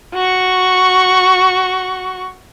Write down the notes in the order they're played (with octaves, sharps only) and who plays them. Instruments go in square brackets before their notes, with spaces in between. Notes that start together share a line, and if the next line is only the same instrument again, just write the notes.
[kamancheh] F#4 C#6